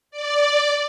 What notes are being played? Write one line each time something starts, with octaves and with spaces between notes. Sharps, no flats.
D5